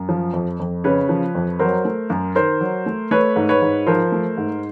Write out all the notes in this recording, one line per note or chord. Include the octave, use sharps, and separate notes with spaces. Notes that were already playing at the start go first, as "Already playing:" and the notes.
Already playing: F#2
F3
F2
F2
C#3 B4 C#5
F3
F2
F#3 A#4 C5
A3
F#2
D#3 A#4 C5
F#3
A3
A3 B4 C#5
G#2
B4 C#5
G#2
F3 A#4 C5
A3
G#2